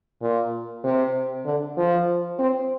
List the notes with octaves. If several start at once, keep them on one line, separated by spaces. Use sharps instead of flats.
A#2
C3
D3
F3
C4